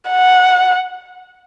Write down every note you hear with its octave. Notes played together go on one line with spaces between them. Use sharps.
F#5